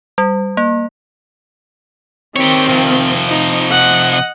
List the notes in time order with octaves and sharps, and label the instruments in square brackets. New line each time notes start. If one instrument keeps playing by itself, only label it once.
[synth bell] G3
A#3
[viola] D#3 C4 [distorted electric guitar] G4 C#5
[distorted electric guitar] C3 F3
[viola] D#4
D#5 F#5